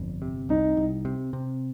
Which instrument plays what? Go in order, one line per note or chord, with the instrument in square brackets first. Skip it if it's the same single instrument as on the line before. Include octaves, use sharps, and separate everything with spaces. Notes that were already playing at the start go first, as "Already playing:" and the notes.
Already playing: [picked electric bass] G1 F2
C3
[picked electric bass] C2 [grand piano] D#4
[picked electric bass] C2
C3
C3